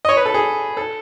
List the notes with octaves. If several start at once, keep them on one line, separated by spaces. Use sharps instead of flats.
D#5
C#5
B4
A4
G#4
A4